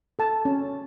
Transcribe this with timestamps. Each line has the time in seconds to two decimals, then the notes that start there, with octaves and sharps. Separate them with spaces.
0.19 A4 A5
0.45 C#4